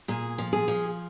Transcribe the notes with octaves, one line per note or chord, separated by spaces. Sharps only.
A#2 G#4
F3
G#4
F3